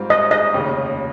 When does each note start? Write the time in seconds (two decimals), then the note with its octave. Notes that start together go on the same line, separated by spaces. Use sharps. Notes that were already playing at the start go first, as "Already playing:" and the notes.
Already playing: G#2 G3 C4 F4
0.10 D#5
0.31 D#5
0.53 F1 D#2 C#3